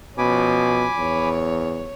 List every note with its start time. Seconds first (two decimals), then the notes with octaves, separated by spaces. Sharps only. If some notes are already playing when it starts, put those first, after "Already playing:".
0.18 B2 F3 C#4 G#5 B5 D6
0.98 E2 C#5